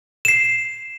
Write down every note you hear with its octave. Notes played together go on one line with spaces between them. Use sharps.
C7 E7